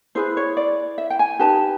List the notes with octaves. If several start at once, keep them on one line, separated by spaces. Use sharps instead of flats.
E4 G#4 B4 C5
C#5
D5
E5
G5
G#5
D#4 G4 B4 A5